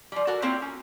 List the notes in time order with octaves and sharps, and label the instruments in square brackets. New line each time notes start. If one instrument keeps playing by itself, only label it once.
[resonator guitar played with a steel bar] F3 G3
F#4 A4 A#4
A#3 C4 E4 F4 C#5 G5
C#4